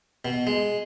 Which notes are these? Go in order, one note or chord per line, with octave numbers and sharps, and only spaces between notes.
B2
G#3